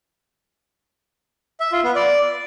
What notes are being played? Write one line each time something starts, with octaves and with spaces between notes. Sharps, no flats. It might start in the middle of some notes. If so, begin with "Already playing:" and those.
E5
F4
B3
D5